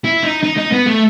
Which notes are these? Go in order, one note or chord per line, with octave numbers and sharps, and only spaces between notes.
E4
D#4
D#4
D#4
B3
A3